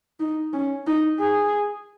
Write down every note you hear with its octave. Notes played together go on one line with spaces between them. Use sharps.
D#4
C#4
D#4
G#4